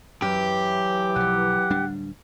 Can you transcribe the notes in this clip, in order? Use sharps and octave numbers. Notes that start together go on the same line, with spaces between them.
F#2 E3 F#3 G4
B1 F3 F#5
D1 G3 D4